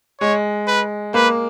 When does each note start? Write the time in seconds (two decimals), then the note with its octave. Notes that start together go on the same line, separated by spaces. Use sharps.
0.21 G#3 C#5
0.68 B4
1.14 A#3 B4